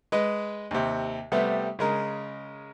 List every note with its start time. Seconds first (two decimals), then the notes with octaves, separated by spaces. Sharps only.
0.12 G#3 B4 D#5
0.71 D#2 C3
1.32 C3 G3 A3 B3
1.79 C#3 G#3 A#4